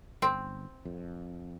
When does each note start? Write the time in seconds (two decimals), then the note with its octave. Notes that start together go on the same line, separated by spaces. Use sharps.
0.22 G1 C4
0.85 F2